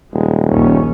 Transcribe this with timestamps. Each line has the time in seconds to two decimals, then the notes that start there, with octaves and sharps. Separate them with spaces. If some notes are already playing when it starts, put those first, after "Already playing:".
0.13 D#1 G#3
0.50 A#1 D#2 C#4